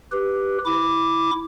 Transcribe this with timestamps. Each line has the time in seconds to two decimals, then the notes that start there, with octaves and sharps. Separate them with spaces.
0.12 G4 B4
0.66 E4 D6